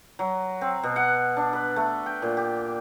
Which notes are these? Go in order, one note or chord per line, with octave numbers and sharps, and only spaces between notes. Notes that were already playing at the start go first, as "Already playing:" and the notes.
F#3
C4
B2
F#5
D4
B4
A3
G5
A#2
G4